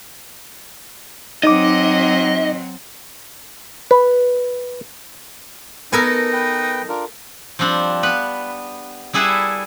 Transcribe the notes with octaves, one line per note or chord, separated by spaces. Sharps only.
F#3 C4 D#4 D#5 D6
B4
B3 D#4 A4 A#4 G#5
B4 G5
D4 F4 A#4
F3 G3 C4 D4
B3 B4 B5
G3 E4 G#4 A4 B4 E5